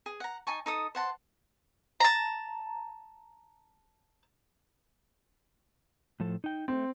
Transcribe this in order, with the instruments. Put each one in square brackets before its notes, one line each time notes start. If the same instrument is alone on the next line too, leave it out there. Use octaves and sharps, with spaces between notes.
[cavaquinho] G#4
F#5 A#5
D#4 G#5 A5 C#6
D#4 A4 D#6
C5 F#5 A5 C6
[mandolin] A5 A#5
[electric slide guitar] A2 F3 A4
D#4 G5
[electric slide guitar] A3 [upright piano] C4